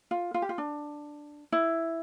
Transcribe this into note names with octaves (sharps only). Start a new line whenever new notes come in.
F4
F4
G4
F4
D4
E4